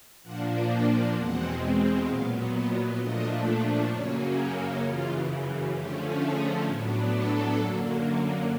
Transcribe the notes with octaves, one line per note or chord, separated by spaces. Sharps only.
A#2 F3 A#3 D4 F#5
G5
E2 B2 G#3 C4 F#5
A#2 F#3 B3 F5
D#5
A#2 F3 A3 D4 D#5
F#2 C#3 F#3 A#3 C#4 C#5
G4
F#2 C#3 E3 F4
D3 F3 A3 C#4 G4
G#4
A2 F#3 B3 D4
A4
F#2 D3 F#3 A#3